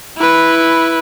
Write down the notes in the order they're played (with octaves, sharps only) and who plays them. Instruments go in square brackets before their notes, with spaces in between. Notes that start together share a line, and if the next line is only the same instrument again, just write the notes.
[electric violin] E4 B4